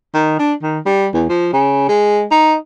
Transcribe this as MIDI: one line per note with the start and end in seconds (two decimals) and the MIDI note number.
0.14 0.35 51
0.39 0.53 62
0.62 0.79 51
0.86 1.08 55
1.14 1.25 40
1.29 1.51 53
1.53 1.85 49
1.89 2.25 56
2.31 2.55 63